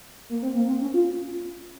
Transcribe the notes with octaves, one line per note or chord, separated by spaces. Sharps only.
A#3
C4
A#3
C4
C#4
F4